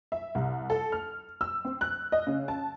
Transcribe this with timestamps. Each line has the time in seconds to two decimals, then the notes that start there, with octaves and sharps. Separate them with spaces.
0.12 E5
0.35 C2
0.70 A4
0.92 F6
1.41 E6
1.65 C4
1.81 F#6
2.12 D#5
2.27 C#3
2.48 A5